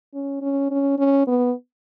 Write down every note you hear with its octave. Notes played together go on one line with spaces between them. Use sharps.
C#4
C#4
C#4
C#4
B3